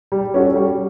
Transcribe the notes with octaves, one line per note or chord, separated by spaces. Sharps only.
G3
C#4 F#4 A4
G3